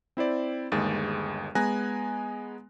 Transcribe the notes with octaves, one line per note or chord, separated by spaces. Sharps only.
C4 E4 C5 D5
G1 D#2 G#3 G#4 A6
G#3 B3 G#5 A#5 F#6 A#6